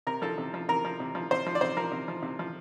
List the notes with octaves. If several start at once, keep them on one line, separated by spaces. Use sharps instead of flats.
C3 A#4
F3 A4
C3
F3
C3 A#4
F3
C3
F3
C3 C5
F3
D5
C3 C5
F3 A#4
C3
F3
C3
F3